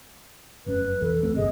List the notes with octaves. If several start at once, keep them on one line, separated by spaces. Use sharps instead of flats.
F1 F#2 C#4 B4
B1 F2 E3 A4
C#2 A3 C4
G1 C#2 C3 G#4 D#5